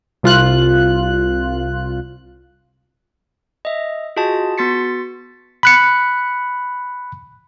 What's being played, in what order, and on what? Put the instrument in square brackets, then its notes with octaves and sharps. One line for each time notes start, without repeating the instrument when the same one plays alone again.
[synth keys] C2 F4 F#6
[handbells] D#5 E5
F4 F#4 G#4 D#5 A5
B3 F#4 C6 A6 B6 C#7
[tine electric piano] B5 F#6 C#7